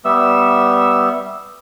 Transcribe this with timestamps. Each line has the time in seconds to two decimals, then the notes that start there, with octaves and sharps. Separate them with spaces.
0.05 G3 B3 E5 E6